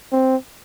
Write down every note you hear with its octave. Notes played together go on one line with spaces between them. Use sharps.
C4